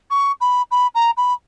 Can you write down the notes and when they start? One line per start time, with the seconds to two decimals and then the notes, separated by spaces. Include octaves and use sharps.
0.10 C#6
0.40 B5
0.71 B5
0.94 A#5
1.17 B5